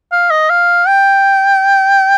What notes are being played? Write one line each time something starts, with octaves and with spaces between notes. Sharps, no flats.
F5
D#5
F5
G5